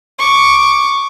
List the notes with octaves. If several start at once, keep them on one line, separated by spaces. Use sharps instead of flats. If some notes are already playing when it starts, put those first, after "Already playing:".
C#6 D6